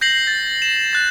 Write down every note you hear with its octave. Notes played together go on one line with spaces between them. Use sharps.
G6 A#6 C7 F#7
A6
E7
F#6 A6